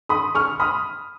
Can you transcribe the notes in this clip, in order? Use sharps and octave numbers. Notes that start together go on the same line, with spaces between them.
B5 D#6
C#6 F6
B5 D#6